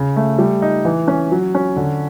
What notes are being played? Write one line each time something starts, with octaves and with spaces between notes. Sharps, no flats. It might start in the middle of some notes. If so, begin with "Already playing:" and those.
Already playing: C#3
A3
G3
D#4
E3
C#4
F#3
C#4
D3